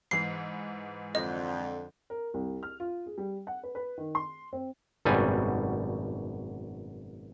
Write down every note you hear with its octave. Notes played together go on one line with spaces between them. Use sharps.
G#2 E3 C7
F2 D3 D#5
A#4
C2
F6
F4
G#4
G3
F#5
B4
B4
D#3
C6
C4
G#1 F#2 B2 G3 G#5